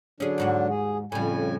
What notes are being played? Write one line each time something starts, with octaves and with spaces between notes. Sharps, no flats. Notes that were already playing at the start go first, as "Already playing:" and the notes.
D3 F#3 C#4 D4 G#4
D#2 G#2 F#4
G#4
F2 A2 C#3 G3 G#5